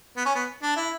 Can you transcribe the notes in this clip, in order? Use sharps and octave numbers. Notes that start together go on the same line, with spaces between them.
B3
C#4
B3
D4
E4